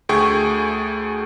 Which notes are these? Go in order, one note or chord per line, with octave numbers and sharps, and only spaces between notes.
D2 A3 G#4 G5 C#6